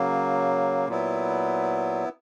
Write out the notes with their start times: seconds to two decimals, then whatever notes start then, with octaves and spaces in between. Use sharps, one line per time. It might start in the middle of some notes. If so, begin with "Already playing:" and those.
Already playing: C#3 F#3 A#3
0.88 A#2 F#3 B3 E4